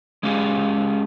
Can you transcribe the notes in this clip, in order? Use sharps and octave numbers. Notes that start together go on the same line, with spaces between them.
G#3 C#4 F4 G4 G#4